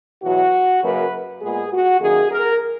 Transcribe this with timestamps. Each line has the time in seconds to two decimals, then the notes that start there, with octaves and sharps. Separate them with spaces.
0.22 E2 B2 F#3 F#4
0.83 F#2 C#3 F#3 A#3 B4
1.42 A#2 G#3 B3 G#4
1.72 F#4
2.01 F#2 D#3 A#3 G#4
2.31 A#4